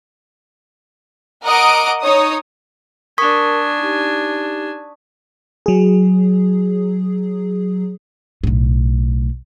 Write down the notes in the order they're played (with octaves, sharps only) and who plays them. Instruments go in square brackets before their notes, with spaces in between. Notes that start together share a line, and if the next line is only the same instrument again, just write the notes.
[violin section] A#4 D#5 F#5 D6 D#6 D7
D#4 C#5 D#6
[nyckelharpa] D4 G#5 [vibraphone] A#4 A5 [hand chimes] C#6 D#6 B6
[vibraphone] D#4 G4
[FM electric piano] F#3 G#4
[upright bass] B1 A2